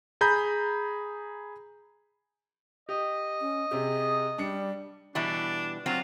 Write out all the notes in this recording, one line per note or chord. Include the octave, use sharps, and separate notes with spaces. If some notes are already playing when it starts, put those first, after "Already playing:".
G#4 A#5 B5 G6
G4 D#5
C#4
C3 G4 G#4
G3 D4 C#7
B2 E3 G3 D4
F#3 C4 D4 F4